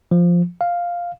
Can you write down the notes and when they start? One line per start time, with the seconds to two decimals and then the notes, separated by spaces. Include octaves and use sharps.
0.11 F3
0.61 F5